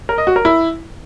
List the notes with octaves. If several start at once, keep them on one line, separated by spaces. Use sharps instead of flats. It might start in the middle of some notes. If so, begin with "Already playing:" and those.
A#4
D#5
F#4
A#4
E4